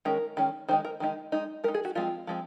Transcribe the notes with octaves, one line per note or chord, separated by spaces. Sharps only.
D#3 G#3 C#4 A#4
D#3 G#3 C#4
D#3 G#3 D#4 C5
A#4
D#3 G#3 D#4
G#3 D#4
G#3 D#4 A#4
G#4
F#4
F3 G#3 C4 F4
F3 G#3 C4